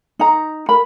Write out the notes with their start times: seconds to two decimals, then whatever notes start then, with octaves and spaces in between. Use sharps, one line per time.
0.19 D#4 A#5
0.69 A#4 B5